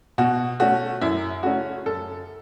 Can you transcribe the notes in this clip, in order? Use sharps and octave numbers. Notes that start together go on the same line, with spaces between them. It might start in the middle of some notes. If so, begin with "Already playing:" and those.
B2 F#4
A3 C#4 F#4
F#2 E4
C#3 A3 C#4 F#4
F#2 A4